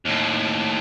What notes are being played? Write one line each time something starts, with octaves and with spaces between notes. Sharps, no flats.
D#2 A2